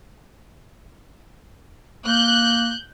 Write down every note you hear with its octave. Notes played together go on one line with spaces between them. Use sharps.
A#3 F#6 G6